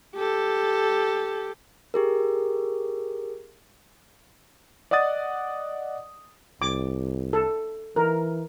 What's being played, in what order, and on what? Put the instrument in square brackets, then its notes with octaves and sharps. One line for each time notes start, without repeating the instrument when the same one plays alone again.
[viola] G4 A4
[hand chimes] G4 G#4 A#4
[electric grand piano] D5 D#5 F#5 D#6 A6
[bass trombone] C2 [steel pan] D6
[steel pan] A4
[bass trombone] E3 [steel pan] A#4